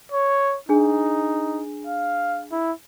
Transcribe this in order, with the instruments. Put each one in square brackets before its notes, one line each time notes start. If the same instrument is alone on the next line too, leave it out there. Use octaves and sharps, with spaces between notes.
[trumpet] C#5
[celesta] D4 G#4 G#5 [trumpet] D#4
[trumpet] F5
E4